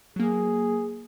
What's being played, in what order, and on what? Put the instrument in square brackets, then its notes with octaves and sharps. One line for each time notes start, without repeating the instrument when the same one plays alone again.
[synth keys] F#3 A#3 [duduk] G#4